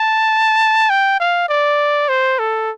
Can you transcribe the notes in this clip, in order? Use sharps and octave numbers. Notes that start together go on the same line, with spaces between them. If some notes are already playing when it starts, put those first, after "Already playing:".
Already playing: A5
G5
F5
D5
C5
A4